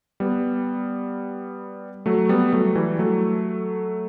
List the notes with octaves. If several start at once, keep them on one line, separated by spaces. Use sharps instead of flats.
G3 B3
F#3 A3
G3 B3
F#3 A3
E3 G3
F#3 A3